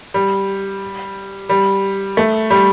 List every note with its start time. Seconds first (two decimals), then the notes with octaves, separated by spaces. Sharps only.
0.14 G3
1.49 G3
2.17 A3
2.50 G3